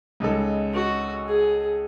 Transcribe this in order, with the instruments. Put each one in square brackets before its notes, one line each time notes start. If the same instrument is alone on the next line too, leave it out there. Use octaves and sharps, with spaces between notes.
[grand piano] C#2 C#3 G#3 D#4 A4
[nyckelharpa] F#4
G#4